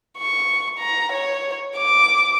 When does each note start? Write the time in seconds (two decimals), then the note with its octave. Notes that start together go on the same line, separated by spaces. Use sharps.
0.18 C#6
0.79 A#5
1.13 C#5
1.76 D6